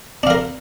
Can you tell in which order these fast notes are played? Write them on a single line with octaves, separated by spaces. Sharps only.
D4 F5 A#4